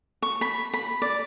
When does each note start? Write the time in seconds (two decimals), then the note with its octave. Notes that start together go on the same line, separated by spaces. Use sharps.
0.22 C#6
0.41 B5
0.74 B5
1.02 D5